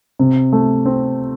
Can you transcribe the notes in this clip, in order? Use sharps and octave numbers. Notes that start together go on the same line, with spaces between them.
C3
A3
C4